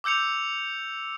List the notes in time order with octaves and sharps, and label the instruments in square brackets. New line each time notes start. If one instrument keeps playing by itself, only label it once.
[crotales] D6 E6 G6 C#7 F7